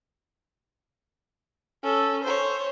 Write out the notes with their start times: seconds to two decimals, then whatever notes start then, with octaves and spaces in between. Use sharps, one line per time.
1.84 C#4 A4
2.23 C5 C#5